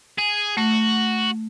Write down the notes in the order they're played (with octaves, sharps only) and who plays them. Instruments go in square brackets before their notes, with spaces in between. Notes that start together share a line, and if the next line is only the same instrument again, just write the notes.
[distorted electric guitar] G#4
[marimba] A3 [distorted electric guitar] F#4